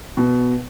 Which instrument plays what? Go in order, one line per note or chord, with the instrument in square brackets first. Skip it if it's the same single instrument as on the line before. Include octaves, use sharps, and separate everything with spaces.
[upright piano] B2